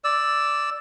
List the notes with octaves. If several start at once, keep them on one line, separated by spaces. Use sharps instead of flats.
D5 E6